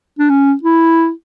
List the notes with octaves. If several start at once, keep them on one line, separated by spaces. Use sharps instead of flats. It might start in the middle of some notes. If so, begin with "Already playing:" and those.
D4
C#4
E4